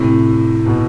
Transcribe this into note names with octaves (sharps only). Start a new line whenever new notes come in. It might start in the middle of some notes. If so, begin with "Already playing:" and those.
Already playing: A2 C3
B2